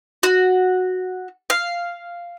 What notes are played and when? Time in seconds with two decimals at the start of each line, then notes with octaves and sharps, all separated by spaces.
0.23 F#4
1.50 F5